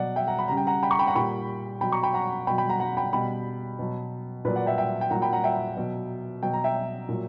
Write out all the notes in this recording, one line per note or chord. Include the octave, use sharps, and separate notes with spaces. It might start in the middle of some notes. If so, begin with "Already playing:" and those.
Already playing: B2 F#3 D5 F#5
E5 G5
F#5 A#5
B5
C#3 G3 A#5
G5
F#5 A#5
G5 B5
A#5 C#6
G5 B5
F#5 A#5
A#2 G3 G5 B5
B2 F#3 G5 B5
A#5 C#6
G5 B5
F#5 A#5
B2 F#3 G5 B5
G5 B5
F#5 A#5
F#5 A#5
G5 B5
B2 G3 G5 B5
B2 F#3
A#2 F#3 B4 D5
D5 F#5
E5 G5
E5 G5
G5
A#2 F#3 F#5 A#5
G5 B5
F#5 A#5
E5 G5
B2 F#3
B2 F#3 G5
A#5
E5 G5
A#2 F#3